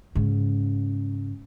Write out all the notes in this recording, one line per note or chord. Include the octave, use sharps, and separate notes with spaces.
G#2 C#3